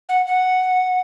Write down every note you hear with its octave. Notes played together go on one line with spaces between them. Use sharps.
F#5
F#5